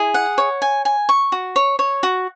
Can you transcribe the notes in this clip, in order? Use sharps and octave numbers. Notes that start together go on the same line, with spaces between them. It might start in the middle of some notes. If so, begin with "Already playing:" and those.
Already playing: E4 G#4
F#5
C#5
G#5
G#5
C#6
F#4
C#5
C#5
F#4